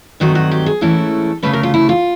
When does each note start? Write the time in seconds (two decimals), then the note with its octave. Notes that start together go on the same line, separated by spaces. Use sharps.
0.20 G2 D#3 F#3 A3 C4 F#4
0.35 F#4
0.51 G4
0.66 G#4
0.81 G#2 E3 A3 C#4 E4 A4
1.43 D2 C#3 F#3 A3 C#4 B4
1.53 A#4
1.63 F4
1.74 E4
1.89 F4